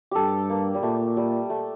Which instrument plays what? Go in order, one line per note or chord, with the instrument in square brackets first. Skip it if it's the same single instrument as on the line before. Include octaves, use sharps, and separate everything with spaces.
[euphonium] G2 [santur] G4 A4
[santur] A#3
G3
[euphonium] A#2 [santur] A3
[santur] G3
A3